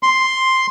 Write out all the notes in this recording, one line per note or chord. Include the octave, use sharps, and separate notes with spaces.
C6